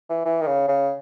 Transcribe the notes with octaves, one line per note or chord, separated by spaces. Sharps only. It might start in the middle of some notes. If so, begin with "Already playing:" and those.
E3
E3
D#3
C#3
C#3